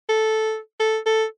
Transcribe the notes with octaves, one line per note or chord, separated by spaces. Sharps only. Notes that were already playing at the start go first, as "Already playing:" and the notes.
A4
A4
A4